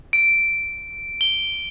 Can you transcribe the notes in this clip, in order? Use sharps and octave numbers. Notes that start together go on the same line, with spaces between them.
D7
G7